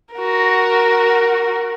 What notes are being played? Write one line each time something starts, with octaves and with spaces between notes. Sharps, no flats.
F#4 A#4